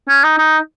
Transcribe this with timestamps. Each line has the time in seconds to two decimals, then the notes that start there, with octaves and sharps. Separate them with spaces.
0.08 C#4
0.24 D#4
0.38 D#4